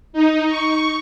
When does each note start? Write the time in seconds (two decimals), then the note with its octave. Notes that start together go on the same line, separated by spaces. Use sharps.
0.13 D#4
0.48 C#6